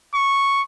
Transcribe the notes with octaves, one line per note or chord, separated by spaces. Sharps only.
C#6